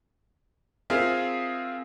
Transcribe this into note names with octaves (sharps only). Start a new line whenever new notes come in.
C4 F4 G#4 A#4 E5 F5